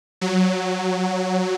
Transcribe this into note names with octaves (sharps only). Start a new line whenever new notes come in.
F#3